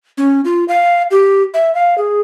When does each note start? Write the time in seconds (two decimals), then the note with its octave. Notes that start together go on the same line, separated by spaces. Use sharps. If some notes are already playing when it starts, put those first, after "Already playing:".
0.18 C#4
0.45 F4
0.68 F5
1.11 G4
1.54 E5
1.75 F5
1.98 G#4